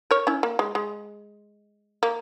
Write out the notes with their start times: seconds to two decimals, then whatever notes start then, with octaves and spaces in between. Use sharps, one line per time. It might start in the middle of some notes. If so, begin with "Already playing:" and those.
0.11 A#4 C#5
0.27 C#4 E4
0.43 A#3
0.59 G#3
0.75 G#3
2.03 A#3